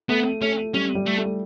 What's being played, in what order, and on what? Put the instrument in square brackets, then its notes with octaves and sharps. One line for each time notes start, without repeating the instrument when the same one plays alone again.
[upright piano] A3 [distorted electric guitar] B3
[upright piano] A3 [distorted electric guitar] C#4
[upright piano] G3 [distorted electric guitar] C#4
[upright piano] G3
[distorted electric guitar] A3
[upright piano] A3